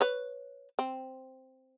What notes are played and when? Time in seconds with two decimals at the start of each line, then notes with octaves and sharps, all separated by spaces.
0.01 B4 C#5
0.79 C4